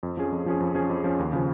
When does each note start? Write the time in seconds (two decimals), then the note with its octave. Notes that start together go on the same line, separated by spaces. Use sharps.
0.03 F2
0.17 F3 C#4 G#4
0.32 F2
0.46 F3 C#4 G#4
0.60 F2
0.75 F3 C#4 G#4
0.90 F2
1.04 F3 C#4 G#4
1.19 D#2
1.33 C#3 F3